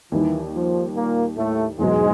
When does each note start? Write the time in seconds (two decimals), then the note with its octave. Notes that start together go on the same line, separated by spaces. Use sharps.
0.12 D#2 D#3 E3 G3
0.54 F3
0.95 A#2 A#3
1.37 A2 A3
1.79 E2 G#2 B2 F#3 G#3